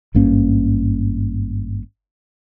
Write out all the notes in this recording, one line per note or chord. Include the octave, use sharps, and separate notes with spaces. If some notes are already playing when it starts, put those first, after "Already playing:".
G#1 G2 A#3 C#4